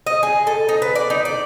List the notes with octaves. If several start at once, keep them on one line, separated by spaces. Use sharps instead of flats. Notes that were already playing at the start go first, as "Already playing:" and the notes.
D#5
G#4
A4
D#4
B4
D5
D#4
D5